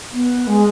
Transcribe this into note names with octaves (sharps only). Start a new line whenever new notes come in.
B3
G#3